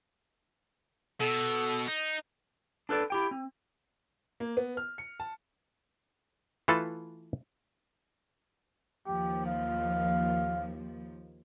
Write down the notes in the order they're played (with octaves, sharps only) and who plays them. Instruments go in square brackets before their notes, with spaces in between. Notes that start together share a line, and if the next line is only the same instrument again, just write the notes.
[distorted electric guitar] B2 [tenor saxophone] A4
[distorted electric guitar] D#4
[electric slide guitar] D4 A4 B4 D5
E4 G4 G5
C4
[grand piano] A#3
B3
F6
C#7
A5
[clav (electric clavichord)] E3 A3 F4 A4 B4 A5
[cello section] D#2 F3 [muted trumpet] G4
[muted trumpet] F5